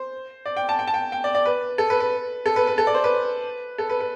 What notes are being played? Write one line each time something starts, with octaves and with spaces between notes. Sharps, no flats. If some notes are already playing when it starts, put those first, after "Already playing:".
Already playing: C5
D5
G5
A5
G5
A5
G5
G5
D5
D5
B4
A4
B4
B4
A4
B4
B4
A4
D5
C5
B4
A4
B4
B4